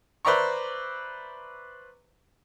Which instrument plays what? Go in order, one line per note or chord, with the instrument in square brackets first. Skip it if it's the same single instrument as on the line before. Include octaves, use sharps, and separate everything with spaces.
[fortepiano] B4 C5 D5 E5 A#5 C#6